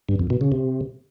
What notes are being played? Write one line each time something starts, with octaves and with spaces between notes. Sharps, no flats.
G2
F2
B2
C#3
C3